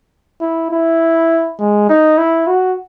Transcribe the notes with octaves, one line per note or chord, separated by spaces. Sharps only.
E4
E4
G#3
D#4
E4
F#4